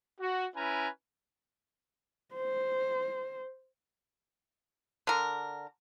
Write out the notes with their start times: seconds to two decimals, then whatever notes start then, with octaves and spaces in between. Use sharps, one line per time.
0.21 F#4
0.56 C#4 E4 B4 G#5 A#5
2.35 C5
5.07 D3 A#4